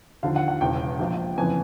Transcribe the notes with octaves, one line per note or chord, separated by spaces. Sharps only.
D#2 D3 F3 F5
F#5
F#5
E1 E2 C#3 E3 G5
A#1 A#2 F3
F#1 F2 C#3 E3 G#5